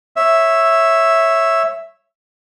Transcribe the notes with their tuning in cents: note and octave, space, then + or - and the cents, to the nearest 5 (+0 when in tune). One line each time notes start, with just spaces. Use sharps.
C#5 -10 E5 +0